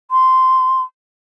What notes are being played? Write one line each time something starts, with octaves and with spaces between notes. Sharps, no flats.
C6